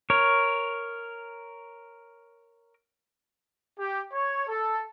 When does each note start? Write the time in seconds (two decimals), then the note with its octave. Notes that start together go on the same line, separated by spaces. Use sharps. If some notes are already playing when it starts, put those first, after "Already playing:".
0.10 A#4 C#5
3.79 G4
4.13 C#5
4.48 A4